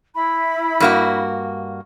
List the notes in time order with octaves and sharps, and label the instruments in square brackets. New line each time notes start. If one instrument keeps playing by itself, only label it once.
[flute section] E4 B5
[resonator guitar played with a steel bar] G2 A#3 F#4